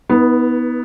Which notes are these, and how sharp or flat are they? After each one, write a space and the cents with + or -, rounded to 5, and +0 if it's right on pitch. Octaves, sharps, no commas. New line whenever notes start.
B3 +0 D#4 +45 B4 -35